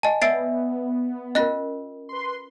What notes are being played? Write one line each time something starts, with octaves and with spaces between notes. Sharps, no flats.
D#5 G#5 A5
B3 D5 E5 E6 A6 C7 D7
C#4 F4 A#4 D#5 F#6 A#6
B4 C6